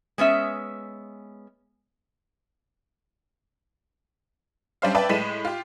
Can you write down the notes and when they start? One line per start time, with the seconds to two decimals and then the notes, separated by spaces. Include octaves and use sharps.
0.18 G#3 B3 C#4 E5
4.82 G3 C#4 D4 C5 E5 F5
4.95 B4 D5 E5 G5 A5
5.09 A2 G#3 B6 D#7 E7
5.45 F4 G4